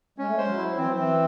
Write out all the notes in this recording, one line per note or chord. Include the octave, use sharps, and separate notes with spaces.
G#3 C#4
A3
G#3 C5
F#3
E4
E3 C4
F#3
E3 C4